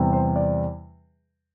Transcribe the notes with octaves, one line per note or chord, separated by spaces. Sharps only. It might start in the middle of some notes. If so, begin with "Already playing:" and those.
Already playing: E2 C3 G3
C5
D5